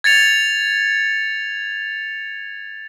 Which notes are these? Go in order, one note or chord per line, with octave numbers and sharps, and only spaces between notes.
G#6 A6 C#7 F7